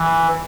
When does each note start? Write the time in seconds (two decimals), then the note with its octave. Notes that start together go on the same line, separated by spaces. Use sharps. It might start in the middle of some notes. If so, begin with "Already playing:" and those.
Already playing: E3